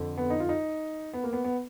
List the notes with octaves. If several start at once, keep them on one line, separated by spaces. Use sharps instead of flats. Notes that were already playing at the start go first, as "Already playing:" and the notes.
Already playing: F2 D3
B3
D#4
F4
D#4
B3
A#3
B3
B3